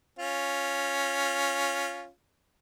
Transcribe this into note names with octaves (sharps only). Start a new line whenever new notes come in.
C#4 F4